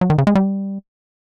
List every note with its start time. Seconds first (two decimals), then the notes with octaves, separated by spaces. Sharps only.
0.01 F#3
0.10 D#3
0.18 C#3
0.27 G#3
0.35 G3